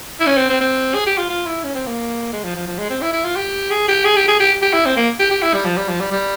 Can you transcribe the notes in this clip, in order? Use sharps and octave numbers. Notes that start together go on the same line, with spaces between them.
E4
C#4
C4
C4
C4
G#4
G4
F4
F4
E4
C#4
C4
A#3
G#3
F3
F3
F3
G#3
C4
E4
E4
F4
G4
G#4
G4
G#4
G4
G#4
G4
G4
E4
C4
A#3
G4
G4
E4
G3
F3
G3
F3
G3
G3